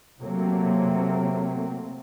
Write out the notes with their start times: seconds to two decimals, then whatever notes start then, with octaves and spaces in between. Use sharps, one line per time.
0.19 C3 F#3 A3 A#3 C4